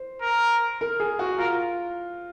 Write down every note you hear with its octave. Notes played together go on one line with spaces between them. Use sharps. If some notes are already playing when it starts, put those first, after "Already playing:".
Already playing: C5
A#4
A#4
G#4
F#4
F4 A#4